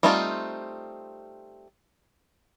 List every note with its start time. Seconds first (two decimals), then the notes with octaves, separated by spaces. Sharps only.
0.03 G3 A3 C4 D#4 F4